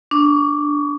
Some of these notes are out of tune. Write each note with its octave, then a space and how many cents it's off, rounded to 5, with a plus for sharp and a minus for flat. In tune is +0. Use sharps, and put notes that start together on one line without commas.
D4 +0 C#6 +25